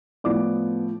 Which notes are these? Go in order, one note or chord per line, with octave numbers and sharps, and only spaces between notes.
A2 F3 B3 D5 D6